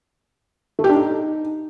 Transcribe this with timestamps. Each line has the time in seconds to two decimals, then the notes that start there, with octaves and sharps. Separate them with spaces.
0.79 A3
0.84 G4
0.89 D4
0.95 D#4